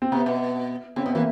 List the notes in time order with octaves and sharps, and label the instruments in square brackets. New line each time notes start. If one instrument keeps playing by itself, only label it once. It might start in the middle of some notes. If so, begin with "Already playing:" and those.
[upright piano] C4
[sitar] C3 [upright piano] B3
[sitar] B2
[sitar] C#3 [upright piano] C4
[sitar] B2 [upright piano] B3
[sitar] E3 [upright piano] A#3